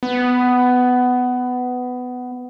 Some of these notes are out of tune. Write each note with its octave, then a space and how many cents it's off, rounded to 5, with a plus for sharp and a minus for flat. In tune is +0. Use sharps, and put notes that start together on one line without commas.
B3 +15